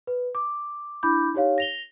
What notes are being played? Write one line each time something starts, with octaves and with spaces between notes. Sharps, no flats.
B4
D6
D4 E4 B5 D6 G6
D#4 G4 C#5 F5
A#6 F7 G7